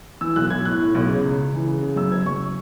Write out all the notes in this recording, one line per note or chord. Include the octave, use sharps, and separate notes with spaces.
E3 E6
B1 F#6
B1 G#6
A2 F#6
A2
B1
C#3
C#2
C#2
E3
C#3
C#3
F#2 E6
F#1 G#6
F#2 C#6